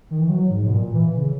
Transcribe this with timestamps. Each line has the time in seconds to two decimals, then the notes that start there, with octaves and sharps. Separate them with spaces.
0.11 D#3
0.19 E3
0.29 F#3
0.50 G#2
0.66 B2
0.73 A#2
0.94 E3
1.16 C#3